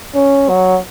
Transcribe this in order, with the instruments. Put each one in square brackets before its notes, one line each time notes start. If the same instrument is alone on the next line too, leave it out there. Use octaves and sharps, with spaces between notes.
[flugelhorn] C#4
F#3